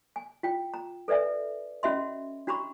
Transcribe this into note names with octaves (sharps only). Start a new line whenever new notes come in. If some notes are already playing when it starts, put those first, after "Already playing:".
G#5
F4 G5
A#5
A4 B4 D5 E5 G#5
C#4 F#4 D#5 E5 B5 C6
D4 F#4 A#5 B5 C#6